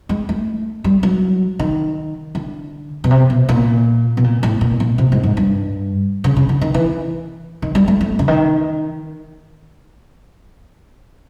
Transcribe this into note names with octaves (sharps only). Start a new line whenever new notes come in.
G#3
A3
G3
F#3
D#3
D3
B2
C3
B2
A#2
B2
A#2
A2
A#2
A#2
C3
G#2
G#2
G2
C#3
C#3
D3
D#3
E3
D#3
G3
A3
A3
C#3
D#3